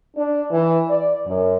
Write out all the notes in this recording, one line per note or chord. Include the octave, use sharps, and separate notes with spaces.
D4
E3
D5
F#2